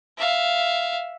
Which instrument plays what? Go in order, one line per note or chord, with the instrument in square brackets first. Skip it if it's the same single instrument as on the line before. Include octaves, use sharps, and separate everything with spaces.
[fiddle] E5 F5